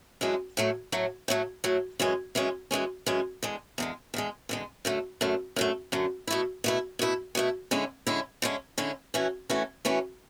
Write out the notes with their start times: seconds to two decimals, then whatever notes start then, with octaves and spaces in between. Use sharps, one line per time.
0.21 F#2 E3 G#3 D4
0.57 A2 F#3 A3
0.92 A2 F#3 A3
1.28 A2 F#3 A3
1.64 A2 F#3 A3
1.99 F#2 E3 G#3 C#4
2.35 F#2 E3 G#3 C#4
2.71 F#2 E3 G#3 C#4
3.06 F#2 E3 G#3 C#4
3.43 E2 D3 G#3
3.78 E2 D3 G#3
4.14 E2 D3 G#3
4.49 E2 D3 G#3
4.85 F#2 D3 A3
5.21 F#2 D3 A3
5.56 F#2 D3 A3
5.92 F#2 D3 A3
6.27 B2 A3 E4
6.64 B2 A3 E4
6.99 B2 A3 E4
7.35 B2 A3 E4
7.71 D3 G#3 C#4 E4
8.07 D3 G#3 C#4 E4
8.42 D3 G#3 C#4 E4
8.78 D3 G#3 C#4 E4
9.14 E3 A3 C#4 F#4
9.49 E3 A3 C#4 F#4
9.85 E3 A3 C#4 F#4